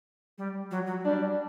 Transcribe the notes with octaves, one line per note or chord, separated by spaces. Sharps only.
G3
F#3
F#3
G3 D4